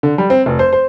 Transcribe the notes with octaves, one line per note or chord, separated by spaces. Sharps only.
D3
G3
C4
F1
C5
C5